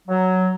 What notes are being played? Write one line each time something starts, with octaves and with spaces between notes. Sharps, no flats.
F#3